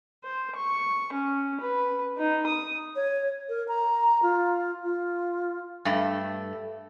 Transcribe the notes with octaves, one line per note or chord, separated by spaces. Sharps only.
C5
C#6
C#4
B4
D#4
D#6
C#5
A#4
A#5
F4
F4
G2 A3